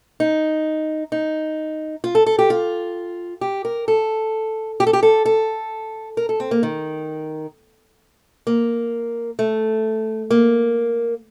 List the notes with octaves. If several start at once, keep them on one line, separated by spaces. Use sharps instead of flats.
D#4
D#4
F4
A4
A4
G4
F4
G4
A#4
A4
G4
A4
G4
A4
A4
A#4
A4
C4
A#3
D#3
A#3
A3
A#3